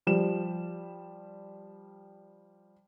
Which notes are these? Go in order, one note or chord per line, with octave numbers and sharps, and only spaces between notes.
F3 G3 E7